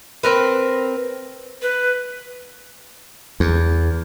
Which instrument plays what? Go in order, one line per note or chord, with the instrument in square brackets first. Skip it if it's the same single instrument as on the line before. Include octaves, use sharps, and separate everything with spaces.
[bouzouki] C4 A#4 B4
[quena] B4
[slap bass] E2